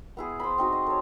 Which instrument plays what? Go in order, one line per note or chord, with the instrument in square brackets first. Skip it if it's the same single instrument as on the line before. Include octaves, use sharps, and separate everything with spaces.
[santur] B3 E4 G#4
C5 B5
C4 D#4 F#4
D#5
A4 C#5